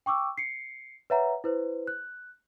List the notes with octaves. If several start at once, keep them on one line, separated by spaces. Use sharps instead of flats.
G5 C#6 D6 E6
C7 C#7
B4 C#5 E5 F#5 A#5
E4 B4 C5
F#6